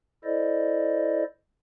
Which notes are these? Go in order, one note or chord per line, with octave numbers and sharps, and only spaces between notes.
E4 A4 C5 D5 D#5